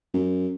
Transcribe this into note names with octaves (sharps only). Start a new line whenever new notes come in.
F#2